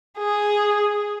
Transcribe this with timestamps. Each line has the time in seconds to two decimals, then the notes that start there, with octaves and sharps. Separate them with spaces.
0.18 G#4